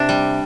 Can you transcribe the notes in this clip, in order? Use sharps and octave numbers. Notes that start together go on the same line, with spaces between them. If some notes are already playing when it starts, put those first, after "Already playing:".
Already playing: C3 D4
G3